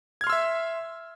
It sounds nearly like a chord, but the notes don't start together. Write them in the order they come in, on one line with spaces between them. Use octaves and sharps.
G#6 F6 C6 E6 E5